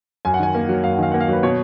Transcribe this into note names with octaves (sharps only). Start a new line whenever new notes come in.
F#2 G#5
F#5
D#3 G#5
A#3
F#3
F#2 F5
F#5
D#3 F5
A#3 F#5
F5
F#3 B4
B2 C#5